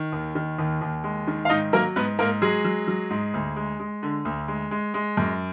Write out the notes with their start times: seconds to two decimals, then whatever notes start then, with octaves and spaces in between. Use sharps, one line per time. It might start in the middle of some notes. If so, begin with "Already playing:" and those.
Already playing: D#3
0.12 D#2
0.35 D#3
0.58 D#2
0.81 D#2
1.04 G#3
1.27 D#3
1.45 F5
1.49 G#2 D#4 D#5
1.73 F#3 A#3 A#4
1.96 G#2 B3 B4
2.19 G#2 A#3 A#4
2.42 F#3 G#3 G#4
2.65 F#3
2.87 F#3
3.10 G#2
3.34 D2
3.56 G#3
3.80 G#3
4.03 D3
4.25 D2
4.48 G#3
4.71 G#3
4.94 G#3
5.17 F#2